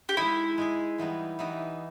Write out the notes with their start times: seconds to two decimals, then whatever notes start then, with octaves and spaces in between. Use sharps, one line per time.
0.09 G4
0.17 G#3 D#4 E4 G#4
0.58 G#3 D#4 G#4
0.98 E3 G3 B3 D#4
1.39 E3 G3 B3 D#4